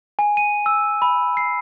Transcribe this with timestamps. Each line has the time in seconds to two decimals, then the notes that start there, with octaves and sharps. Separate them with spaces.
0.19 G#5
0.37 D#7
0.66 E6
1.02 B5
1.37 C7